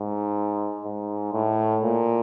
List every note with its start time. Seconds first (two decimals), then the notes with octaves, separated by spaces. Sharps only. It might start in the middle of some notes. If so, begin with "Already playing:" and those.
Already playing: G#2
0.84 G#2
1.33 A2
1.83 A#2